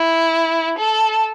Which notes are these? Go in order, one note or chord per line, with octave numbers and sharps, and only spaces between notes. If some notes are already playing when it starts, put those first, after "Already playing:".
Already playing: E4
A4